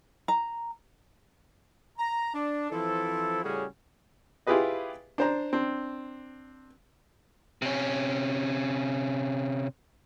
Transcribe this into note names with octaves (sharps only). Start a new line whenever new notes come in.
A#5
A#5
D4
E3 F3 C4 E4 A4
A2 C#3 G3 C#4 F#4 G#4
E4 F4 G4 G#4 B4 D#5
D4 C5 A#5
C4 D4
C3 C#4